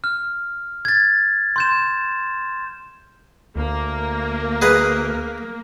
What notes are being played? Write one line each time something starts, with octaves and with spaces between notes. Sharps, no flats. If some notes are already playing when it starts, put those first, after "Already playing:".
F6
G#6 A6
C6 G6 E7
D2 A#3
G#4 B4 D#5